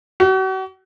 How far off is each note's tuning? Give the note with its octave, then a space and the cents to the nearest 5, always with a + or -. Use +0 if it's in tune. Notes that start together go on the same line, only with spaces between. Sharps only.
F#4 +40